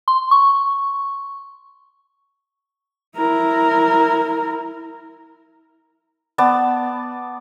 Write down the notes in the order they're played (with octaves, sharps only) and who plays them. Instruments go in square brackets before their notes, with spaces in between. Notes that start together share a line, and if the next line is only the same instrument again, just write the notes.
[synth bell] C6
C#6
[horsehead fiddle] E4 A#4
[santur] B3 D5 A5